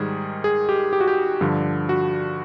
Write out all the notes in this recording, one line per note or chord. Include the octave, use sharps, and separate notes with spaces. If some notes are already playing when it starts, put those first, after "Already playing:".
Already playing: G#2 D#3 G3 G#4
G#4
G4
G4
F#4
G4
G2 D3 F3
F#4